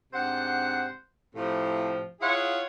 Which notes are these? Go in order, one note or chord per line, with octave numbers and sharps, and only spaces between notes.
G#2 C3 D4 C5 F#5
A2 C3 F3
E4 F4 G#4 C#5 F5 F#5